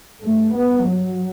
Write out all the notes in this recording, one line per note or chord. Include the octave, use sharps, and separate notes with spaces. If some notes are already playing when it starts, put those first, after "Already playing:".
G2 A3
B3
F#3